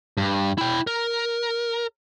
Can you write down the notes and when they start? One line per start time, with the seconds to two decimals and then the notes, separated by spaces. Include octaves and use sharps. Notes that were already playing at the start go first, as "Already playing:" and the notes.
0.17 G2
0.58 E4 G5
0.87 A#4